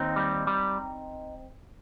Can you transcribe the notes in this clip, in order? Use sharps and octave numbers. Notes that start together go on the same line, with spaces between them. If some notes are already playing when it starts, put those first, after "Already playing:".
Already playing: D#2 C4 D#4
G3
G3